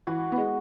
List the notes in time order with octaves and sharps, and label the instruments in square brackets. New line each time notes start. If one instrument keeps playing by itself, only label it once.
[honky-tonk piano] E3 [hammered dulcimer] F#4
[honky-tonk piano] B3
G#3